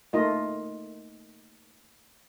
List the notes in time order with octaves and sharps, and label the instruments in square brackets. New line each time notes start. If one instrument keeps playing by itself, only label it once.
[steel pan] A3 A#3 D#4 F4 D#5